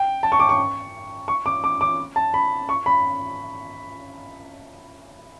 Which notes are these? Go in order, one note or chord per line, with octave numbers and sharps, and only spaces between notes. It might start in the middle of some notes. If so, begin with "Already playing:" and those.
Already playing: G5
A5
C#6
D6
C#6
C#6
D6
D6
D6
A5
B5
C#6
B5